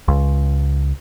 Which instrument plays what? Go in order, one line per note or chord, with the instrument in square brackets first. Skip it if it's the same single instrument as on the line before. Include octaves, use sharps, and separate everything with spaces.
[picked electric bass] C#2